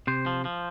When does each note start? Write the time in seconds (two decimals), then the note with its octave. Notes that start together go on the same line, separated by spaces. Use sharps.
0.07 C3 C5
0.26 F3
0.45 F3